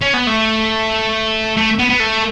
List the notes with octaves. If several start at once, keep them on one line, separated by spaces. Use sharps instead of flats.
C#4
B3
A3
A3
B3
B3
A3